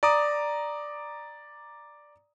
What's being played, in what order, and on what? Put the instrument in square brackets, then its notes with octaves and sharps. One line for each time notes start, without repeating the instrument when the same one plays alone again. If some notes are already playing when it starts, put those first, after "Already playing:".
[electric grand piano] D5 A#5 D6 D#6